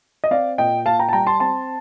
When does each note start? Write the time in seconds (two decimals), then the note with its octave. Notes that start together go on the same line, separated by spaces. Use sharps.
0.24 D#5
0.31 C4 D5 F5
0.58 A#2 D#5 G5
0.86 A#2 F5 A5
0.99 G5 A#5
1.09 A5
1.13 G3 G5 A#5
1.27 A5 C6
1.40 C4 A5 C6